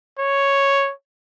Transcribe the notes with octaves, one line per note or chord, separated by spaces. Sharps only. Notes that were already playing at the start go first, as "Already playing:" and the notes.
C#5